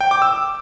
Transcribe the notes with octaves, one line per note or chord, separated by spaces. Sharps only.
G5
D6
E6